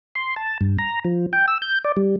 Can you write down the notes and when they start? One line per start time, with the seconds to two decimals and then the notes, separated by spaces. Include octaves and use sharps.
0.15 C6
0.36 A5
0.61 G2
0.79 A#5
1.05 F3
1.33 G5
1.48 E6
1.62 G6
1.84 D5
1.97 G3